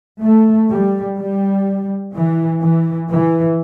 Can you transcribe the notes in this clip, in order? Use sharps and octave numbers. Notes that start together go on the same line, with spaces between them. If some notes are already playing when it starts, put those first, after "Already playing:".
A3
G3
G3
E3
E3
E3